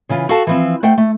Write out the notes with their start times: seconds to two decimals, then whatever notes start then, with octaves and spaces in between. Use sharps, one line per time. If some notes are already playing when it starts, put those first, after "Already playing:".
0.09 C#3 E3 F4
0.29 F#4 A4 F5 G5 A5
0.47 E3 F3 C4
0.83 A3 C5 F#5 G5
0.98 A3